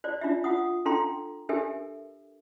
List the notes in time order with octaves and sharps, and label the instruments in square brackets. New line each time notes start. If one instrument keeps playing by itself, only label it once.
[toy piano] C5 D5
D4 F4 D5 E5
F4 F#5 D#6
D4 A4 F5 G5 A#5 C6
D4 G4 A4 A#4 E5 G#5